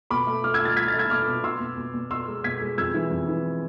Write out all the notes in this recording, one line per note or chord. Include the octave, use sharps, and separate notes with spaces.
B2 B5 D6
A3
A3 D6 F6
E6 G#6
A3
F6 A6
A3 G#6 B6
F6 A6
A3
E6 G#6
B2 D6 F6
B2
B2 C6 E6
B2
B2
B2
B2 C6 E6
G#3
B2 G#6 B6
G#3
F2 E6 G#6
E3
F2
E3